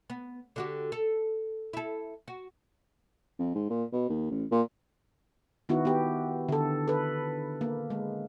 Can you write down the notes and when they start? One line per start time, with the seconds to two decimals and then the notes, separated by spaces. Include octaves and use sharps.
0.10 B3
0.56 D3 F#4 G4
0.92 A4
1.73 E4 A4
2.28 F#4
3.39 F2
3.55 G#2
3.70 A#2
3.93 B2
4.09 D#2
4.31 A1
4.51 A#2
5.69 D#3 B3 E4 F#4
5.85 B3 G4
6.49 D3 A4
6.88 A4 B4
7.61 A#3
7.90 G#3